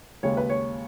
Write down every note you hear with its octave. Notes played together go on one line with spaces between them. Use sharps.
D#2 C#3 G#3 C#5
B4
C#5